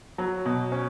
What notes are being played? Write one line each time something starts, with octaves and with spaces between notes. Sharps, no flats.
F#3
B2
C#4